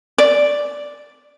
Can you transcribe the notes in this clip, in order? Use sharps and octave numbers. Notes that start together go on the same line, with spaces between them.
D5